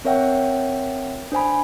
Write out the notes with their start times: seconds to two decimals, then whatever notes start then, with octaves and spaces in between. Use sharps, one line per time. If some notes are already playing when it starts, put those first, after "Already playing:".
0.05 C4 A#4 C#5 E5 F#5 G5
1.32 D4 C5 G#5 B5